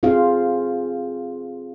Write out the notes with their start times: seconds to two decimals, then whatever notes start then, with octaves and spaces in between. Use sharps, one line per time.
0.03 C4 F4 G#4 A4 C5 F5